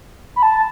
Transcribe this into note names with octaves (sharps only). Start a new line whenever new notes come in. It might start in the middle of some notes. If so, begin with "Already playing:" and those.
B5
A5